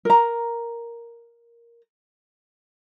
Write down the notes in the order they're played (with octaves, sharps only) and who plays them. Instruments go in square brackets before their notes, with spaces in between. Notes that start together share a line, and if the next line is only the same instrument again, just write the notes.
[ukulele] A#4 A#5